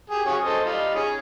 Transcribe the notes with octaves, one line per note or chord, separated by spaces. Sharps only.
G4 G#4
C#4 F#4 G#4
A4 C5 D#5
G3 D#4 F4
C#4 G#4